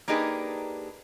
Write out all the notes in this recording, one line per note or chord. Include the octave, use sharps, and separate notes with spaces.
A#3 D4 D#4 G4 G#4 B4